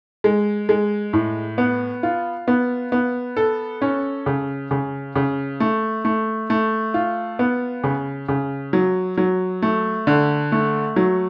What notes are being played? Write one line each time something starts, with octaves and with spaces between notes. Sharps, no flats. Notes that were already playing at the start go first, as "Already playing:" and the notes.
G#3
G#3
A2
B3
F4
B3
B3
A4
C#4
C#3
C#3
C#3
A3
A3
A3
F4
B3
C#3
C#3
F#3
F#3
A3
D3
A3
F#3